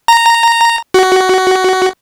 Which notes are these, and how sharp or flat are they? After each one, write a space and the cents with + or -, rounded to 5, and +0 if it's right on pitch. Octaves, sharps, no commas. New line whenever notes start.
A#5 -10
F#4 +15